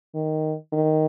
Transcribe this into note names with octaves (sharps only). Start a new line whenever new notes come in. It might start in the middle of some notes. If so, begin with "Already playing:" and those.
D#3
D#3